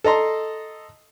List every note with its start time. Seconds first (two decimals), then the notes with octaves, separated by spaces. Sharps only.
0.04 A4 D#5 A#5 C6